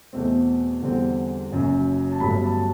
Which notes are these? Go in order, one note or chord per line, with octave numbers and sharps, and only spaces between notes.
E2 B2 A3 C4
E2 D3 G3 C4
F#1 F#2 F#3
A5
G1 G2 F#3 A3 B5
A5